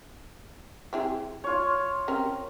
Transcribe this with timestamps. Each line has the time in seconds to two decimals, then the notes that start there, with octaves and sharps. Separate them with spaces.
0.93 C4 E4 G#4
1.44 F4 C#5
2.08 C4 C#4 A#4